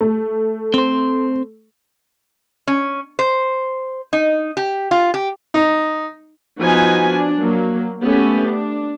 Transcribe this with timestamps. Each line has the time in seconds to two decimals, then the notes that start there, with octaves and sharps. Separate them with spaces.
0.01 A3
0.74 C4 C5
2.67 C#4
3.19 C5
4.13 D#4
4.57 G4
4.91 F4
5.14 G4
5.54 D#4
6.60 F3 B3 D#4 F#4 B4 G#5
7.12 D4
7.41 F#3 A#3
8.03 A3 B3 C#4 G4
8.48 D4